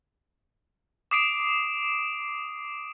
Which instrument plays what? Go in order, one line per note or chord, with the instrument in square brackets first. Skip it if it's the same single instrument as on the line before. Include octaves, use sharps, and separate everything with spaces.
[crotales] D6 D#6 C7 D7 E7